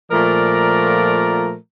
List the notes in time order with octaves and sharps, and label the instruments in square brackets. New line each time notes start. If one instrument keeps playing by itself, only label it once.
[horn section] A#2 F3 A3 A#4 D5 A#5